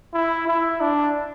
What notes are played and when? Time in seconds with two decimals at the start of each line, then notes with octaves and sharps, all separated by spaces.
0.14 E4
0.47 E4
0.81 D4